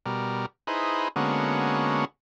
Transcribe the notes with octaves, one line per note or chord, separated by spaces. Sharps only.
B2 G3 A#4
D#4 E4 G#4 B4 C5
D3 G#3 A#3 B3 C#4 F#4